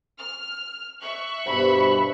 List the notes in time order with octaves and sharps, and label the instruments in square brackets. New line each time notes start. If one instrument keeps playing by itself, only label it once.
[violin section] F6
E5 C#6 F#6
[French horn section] G2 B2 C5 [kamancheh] B5